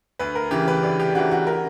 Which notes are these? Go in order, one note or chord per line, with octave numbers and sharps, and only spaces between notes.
D2 B4
A#4
C#3 E3 G4
B4
D2 D5
G4
C#3 E3 F#4
F#4
A#4